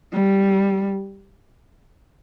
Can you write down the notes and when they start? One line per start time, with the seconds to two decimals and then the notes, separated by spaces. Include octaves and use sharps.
0.13 G3